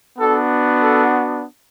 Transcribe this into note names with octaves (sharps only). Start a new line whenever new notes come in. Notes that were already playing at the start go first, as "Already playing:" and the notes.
B3 D4 F#4 A4
A4